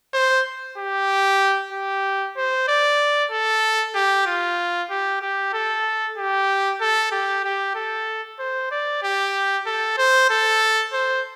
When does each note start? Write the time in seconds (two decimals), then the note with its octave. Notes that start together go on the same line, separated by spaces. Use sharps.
0.14 C5
0.78 G4
1.73 G4
2.37 C5
2.68 D5
3.31 A4
3.95 G4
4.26 F4
4.90 G4
5.22 G4
5.54 A4
6.18 G4
6.81 A4
7.12 G4
7.44 G4
7.75 A4
8.39 C5
8.71 D5
9.03 G4
9.66 A4
9.98 C5
10.30 A4
10.93 C5